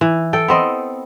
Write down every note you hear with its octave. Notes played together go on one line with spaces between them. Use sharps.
E3
A4 G5
B3 C4 D#5